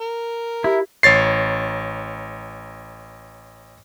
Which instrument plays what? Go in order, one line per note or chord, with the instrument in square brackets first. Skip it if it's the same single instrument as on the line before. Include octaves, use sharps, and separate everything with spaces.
[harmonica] A#4
[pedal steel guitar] E4 [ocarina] G4
[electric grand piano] A1 C#5 A6 C7